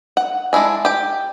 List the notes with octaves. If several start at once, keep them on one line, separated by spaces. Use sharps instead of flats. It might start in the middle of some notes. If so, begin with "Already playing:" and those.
F#5
G#3 D4 E4 G#5
G4 G5